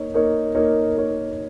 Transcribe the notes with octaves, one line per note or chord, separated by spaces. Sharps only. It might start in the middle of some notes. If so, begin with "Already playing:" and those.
Already playing: A#3 D#4 A#4 C#5
A#3 D#4 A#4 C#5
A#3 D#4 A#4 C#5
A#3 D#4 A#4 C#5